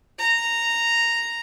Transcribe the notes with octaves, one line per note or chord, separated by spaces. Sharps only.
A#5